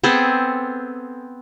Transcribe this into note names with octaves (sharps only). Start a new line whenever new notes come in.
B3 C4 G#4 A4